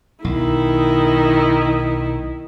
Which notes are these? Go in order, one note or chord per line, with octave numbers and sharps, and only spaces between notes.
B1 D#3 E4